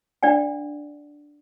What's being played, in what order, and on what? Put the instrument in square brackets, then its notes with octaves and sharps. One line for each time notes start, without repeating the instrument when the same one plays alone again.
[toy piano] D4 D5 F#5 G5